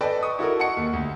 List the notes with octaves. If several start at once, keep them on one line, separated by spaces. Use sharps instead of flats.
A4 B4 D5 D#5 G5 A5
C#6 D#6
E4 F#4 A4 A#4
D#5 F#5 A5 C#6 C#7
D#2
D2